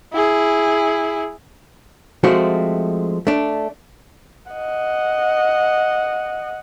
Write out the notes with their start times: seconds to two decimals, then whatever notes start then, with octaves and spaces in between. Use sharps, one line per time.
0.14 E4 G#4
2.24 F3 G#3 A3 C4 F#4
3.27 A3 D4
4.52 D#5 F#5